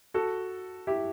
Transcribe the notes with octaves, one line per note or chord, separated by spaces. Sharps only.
F#4 A4
E4 G4